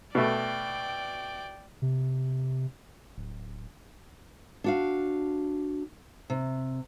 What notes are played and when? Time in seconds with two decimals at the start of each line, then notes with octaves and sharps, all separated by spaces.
0.15 B2 A3 D5 G5
1.82 C3
3.16 D1
4.64 D4 F#4 F5
6.30 C3